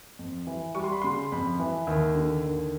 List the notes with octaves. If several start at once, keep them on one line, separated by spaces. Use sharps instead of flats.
F2
E3
G3 C#6
C6
B5
C#3 C6
F2 B5
E3
D#2
D3
D#2